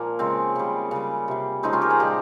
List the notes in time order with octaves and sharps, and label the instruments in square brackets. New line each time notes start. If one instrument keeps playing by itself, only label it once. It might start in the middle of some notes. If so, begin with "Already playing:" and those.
Already playing: [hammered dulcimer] A#2 F3 A#3
C#3 G#3 C4
C#3 G3
C#3 G3
C3 G3
C#3 F3 G#3 C4 D#4
C#4 F4
G4 A#4
G#4 C5
A#2 F3 G#3 G4 A#4